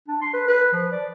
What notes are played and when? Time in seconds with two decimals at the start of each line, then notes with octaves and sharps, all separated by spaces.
0.08 D4
0.21 C6
0.33 B4
0.47 B4
0.73 F3
0.92 D5